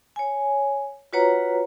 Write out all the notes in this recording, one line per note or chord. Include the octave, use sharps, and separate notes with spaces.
C#5 G#5
F4 F#4 B4 C#5 F#5 A#5